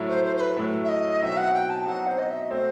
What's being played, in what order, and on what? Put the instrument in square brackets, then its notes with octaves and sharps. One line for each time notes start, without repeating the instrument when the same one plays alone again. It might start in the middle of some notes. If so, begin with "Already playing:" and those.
Already playing: [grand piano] A2 F#3 A3 E4
[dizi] C5
C5
C5
B4
[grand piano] A2 F#3 A3 E4
[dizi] E5
D#5
[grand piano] B2 F#3 C4 D#4 [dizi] E5
[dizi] F#5
G5
A5
[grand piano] B2 F#3 C4 D#4 [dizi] F#5
[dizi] C5
D#5
E5
D#5
[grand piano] B2 A3 C4 [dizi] C5